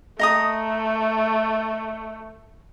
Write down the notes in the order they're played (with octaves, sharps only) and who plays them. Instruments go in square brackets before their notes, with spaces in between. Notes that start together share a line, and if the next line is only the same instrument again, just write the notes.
[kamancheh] A3 [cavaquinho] D#5 A#5 D#6